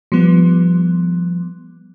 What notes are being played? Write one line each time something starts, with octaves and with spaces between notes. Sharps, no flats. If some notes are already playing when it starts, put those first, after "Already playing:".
F3 G3 B3